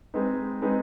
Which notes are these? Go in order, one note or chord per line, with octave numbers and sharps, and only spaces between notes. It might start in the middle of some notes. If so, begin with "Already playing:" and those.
G#3 C4 D#4 B4
G#3 C4 D#4 B4